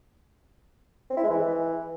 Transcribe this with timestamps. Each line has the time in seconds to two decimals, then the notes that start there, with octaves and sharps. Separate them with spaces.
1.10 C4
1.17 E4
1.23 G#3
1.30 E3